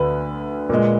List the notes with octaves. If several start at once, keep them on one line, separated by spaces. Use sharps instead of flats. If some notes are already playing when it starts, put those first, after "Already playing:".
Already playing: D2 D3 B4
A#2 G#3